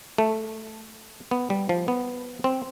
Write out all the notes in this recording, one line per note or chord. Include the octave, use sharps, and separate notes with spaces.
A3
B3
G3
F3
B3
C4